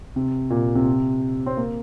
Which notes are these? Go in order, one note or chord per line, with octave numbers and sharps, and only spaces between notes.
C3
A#2
C3
C4
A#3